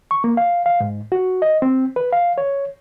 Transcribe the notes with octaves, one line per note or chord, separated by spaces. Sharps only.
C#6
A#3
F5
F5
G#2
F#4
D#5
C4
B4
F5
C#5